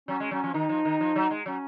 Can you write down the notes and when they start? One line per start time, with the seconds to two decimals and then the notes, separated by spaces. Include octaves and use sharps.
0.08 F#3 C#4
0.20 G#3
0.31 F#3 C#4
0.44 F3
0.54 D#3 D#4
0.69 F3
0.85 D#3
1.01 F3
1.16 F#3
1.31 G#3
1.46 F#3 C#4